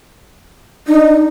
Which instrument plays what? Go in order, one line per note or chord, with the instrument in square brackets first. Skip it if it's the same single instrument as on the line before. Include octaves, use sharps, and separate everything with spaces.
[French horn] D4 [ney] D#4